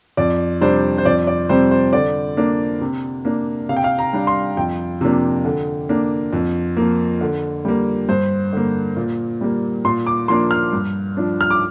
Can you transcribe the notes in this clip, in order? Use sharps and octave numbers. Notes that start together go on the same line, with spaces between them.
F2 D5
C3 G3 D4 C5
C5
F2 D5
D5
C3 G3 C4 C5
C5
D3 D5
A#3 D4
C3
A#3 D4
C3 F5
G5
F5
A#5
G3 D4
C6
F2 G5
C3 F3 A#3 D4
D3
A#3 D4
F2
F3 A#3
D3
G3 A#3
G2 C5
D3 A#3
A#2
G3 A#3
A#2 C6
D6
F3 A#3 D4 C6
F6
G2
F3 D4
F6
D6